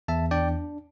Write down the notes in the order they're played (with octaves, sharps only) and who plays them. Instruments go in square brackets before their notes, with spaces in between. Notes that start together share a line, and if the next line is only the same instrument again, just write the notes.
[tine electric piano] E2 E5 A5
D4 D5 G5